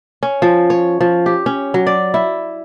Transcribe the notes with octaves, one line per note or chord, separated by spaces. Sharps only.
C#4
F3
C#5
F3
G4
C#4
F#3
D5
E4